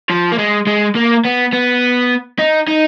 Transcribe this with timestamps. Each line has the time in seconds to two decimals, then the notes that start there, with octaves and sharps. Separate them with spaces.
0.10 F3
0.32 A#3
0.39 G#3
0.67 G#3
0.95 A#3
1.25 B3
1.53 B3
2.39 D#4
2.68 D#4